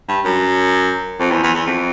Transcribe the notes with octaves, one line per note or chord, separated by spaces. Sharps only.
G2
F#2
F2
E2
E2
E2
F2